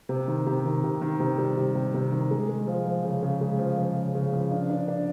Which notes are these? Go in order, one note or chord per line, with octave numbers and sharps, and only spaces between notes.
C3
D#3
C3
D#3
C3
D#3
C3
G3
C3
C3
C3
D#3
G#3
G#3
F3
F3
C#3
C#3
G#3
F3
F3
C#3
C#3
F3
D4
D4
D4